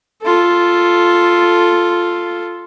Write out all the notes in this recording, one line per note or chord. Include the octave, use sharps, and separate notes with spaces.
F4 A4